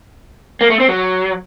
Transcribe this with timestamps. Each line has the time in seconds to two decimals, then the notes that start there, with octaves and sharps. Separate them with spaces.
0.61 A#3
0.70 A3
0.80 C4
0.89 F#3